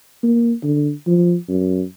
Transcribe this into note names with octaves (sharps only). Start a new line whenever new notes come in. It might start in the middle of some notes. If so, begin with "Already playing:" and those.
A#3
D3
F3
F#2